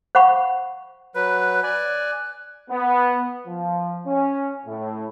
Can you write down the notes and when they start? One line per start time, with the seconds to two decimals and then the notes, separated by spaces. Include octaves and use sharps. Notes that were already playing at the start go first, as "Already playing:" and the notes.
0.15 C5 F5 F#5 B5 C#6
1.15 F#3 B4 F#6
1.63 D5 G#5
2.70 B3
3.47 F3
4.07 C#4
4.66 A2